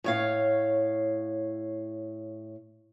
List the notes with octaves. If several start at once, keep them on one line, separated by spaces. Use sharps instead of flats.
A2 C#5 F5